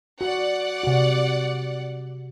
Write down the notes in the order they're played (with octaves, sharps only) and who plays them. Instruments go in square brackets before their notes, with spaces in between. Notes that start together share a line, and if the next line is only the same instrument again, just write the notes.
[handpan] F#4 [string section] D5 F#5
[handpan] C3 F#4